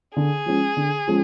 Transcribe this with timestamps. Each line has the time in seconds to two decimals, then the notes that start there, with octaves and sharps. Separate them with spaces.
0.16 D3 G#4
0.46 F3 G#3 C#4
0.77 D3
1.08 F3 G#3 C#4